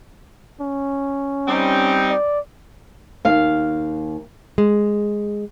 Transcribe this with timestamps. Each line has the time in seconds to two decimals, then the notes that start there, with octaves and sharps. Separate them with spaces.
0.61 C#4
1.48 G3 C4 D#4
2.10 D5
3.25 D#2 F5
4.58 G#3